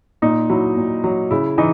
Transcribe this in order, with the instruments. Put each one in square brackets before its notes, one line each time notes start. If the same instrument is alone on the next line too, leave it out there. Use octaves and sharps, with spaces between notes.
[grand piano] A#2 D#4
F#3 E4
A#2
F#3
C#3 E4
E3 D#4